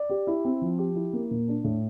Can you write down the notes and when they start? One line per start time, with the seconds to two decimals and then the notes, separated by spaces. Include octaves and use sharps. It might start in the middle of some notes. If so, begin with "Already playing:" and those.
Already playing: D5
0.10 G4
0.27 E4
0.45 C4
0.62 F3
0.78 G4
0.95 E4
1.13 A#3
1.31 A#2
1.48 D4
1.64 A2